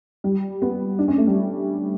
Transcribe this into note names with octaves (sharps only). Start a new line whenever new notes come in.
G3
B3
D4
C#4
A3
G3